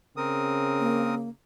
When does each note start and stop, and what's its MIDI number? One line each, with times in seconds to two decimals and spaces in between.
0.17 1.31 49
0.17 1.15 60
0.17 1.15 70
0.17 1.15 87
0.79 1.29 58